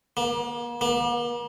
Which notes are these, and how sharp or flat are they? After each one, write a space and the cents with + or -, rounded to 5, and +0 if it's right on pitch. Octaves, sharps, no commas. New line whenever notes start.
A#3 +40
A#3 +45